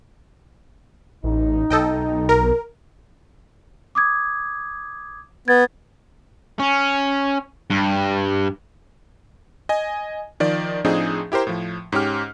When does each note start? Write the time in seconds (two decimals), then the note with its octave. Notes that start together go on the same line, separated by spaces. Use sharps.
1.24 A1 D#4
1.70 B1 A4 D#5 G5
2.29 A#4
3.95 D6 D#6 G#6
5.48 B3 G#6 A6
6.60 C#4
7.70 G2
9.69 D#5 G#5
10.40 D#3 F3 D5
10.84 A2 F3 C4 D4 D#4 G#4
11.32 E4 G4 A#4 C5 A#5
11.47 A2 F3
11.92 G#2 C#4 G4 F6